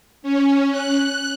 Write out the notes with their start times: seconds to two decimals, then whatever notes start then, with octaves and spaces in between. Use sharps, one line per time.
0.22 C#4
0.71 F#6